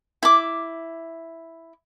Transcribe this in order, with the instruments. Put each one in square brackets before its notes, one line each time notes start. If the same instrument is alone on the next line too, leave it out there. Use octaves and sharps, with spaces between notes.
[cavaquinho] E4 D6